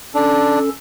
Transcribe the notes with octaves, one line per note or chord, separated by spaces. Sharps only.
C#4 D4 A4